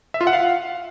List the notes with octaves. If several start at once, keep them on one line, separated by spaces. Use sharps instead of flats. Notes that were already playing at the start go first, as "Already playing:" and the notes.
E5
F4
F#5
F5